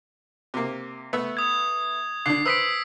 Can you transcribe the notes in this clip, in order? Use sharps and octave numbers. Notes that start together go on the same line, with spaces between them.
C3 A#3
A3 B3 E5
D#6 G#6
D3 D4 C7
B4 C5 D#6 E6 B6 D7